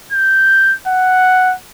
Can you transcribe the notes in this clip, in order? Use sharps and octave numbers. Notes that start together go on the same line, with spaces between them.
G6
F#5